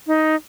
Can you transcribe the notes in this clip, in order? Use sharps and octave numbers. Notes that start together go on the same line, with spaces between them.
D#4